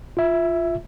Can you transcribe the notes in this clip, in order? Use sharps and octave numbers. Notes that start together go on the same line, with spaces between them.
F4 E5